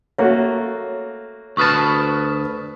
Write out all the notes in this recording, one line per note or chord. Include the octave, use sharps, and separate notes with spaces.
A3 A#3 F#4 C#5
D2 B4 A5 C#6 D#6 F6